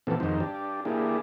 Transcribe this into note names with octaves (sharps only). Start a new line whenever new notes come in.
A#2 E3 B3 C4 F#4 A4
F2 G#2 D#3 D#4 F#4 C5
D4 G4
A#3 D4 E4 G4 G#4